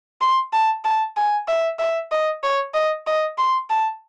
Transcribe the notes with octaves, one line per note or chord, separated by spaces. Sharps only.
C6
A5
A5
G#5
E5
E5
D#5
C#5
D#5
D#5
C6
A5